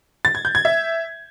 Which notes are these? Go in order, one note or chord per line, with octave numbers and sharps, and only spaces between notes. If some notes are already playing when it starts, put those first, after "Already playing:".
A6
G#6
G6
G#6
E5